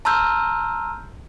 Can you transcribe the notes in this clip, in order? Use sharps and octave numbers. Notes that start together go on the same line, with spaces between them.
A5 A#5 C6 E6 F6 G6